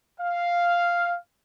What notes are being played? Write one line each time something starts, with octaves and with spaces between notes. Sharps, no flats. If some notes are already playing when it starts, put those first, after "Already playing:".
F5